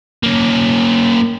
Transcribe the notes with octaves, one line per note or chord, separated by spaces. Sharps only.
A#3 C#4